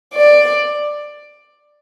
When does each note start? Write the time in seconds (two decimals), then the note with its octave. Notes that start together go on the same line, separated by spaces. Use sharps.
0.15 D5